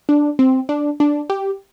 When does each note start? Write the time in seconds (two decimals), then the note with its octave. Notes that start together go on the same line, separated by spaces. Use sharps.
0.09 D4
0.39 C4
0.69 D4
1.00 D4
1.30 G4